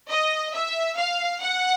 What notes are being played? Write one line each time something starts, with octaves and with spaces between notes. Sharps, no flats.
D#5
E5
F5
F#5